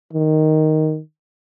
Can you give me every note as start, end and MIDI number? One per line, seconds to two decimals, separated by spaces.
0.13 1.00 51